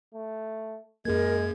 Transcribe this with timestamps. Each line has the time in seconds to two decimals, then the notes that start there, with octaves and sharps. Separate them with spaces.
0.14 A3
1.05 F#2 G#3 A#3 G#4 A#4 G#6